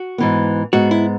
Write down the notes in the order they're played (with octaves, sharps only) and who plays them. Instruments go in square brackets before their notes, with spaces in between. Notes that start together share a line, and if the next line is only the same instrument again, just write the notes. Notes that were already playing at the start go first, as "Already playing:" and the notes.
Already playing: [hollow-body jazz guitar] F#4
[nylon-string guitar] G#2 E3 B3
[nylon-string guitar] G#2 G#3 B3 [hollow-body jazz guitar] F#4
[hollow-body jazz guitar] E4